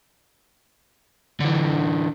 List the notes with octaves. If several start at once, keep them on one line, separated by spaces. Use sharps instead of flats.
D3 E3